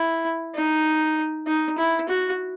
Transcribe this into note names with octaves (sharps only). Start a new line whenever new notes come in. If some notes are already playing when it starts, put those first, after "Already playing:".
Already playing: E4
D#4
D#4
E4
F#4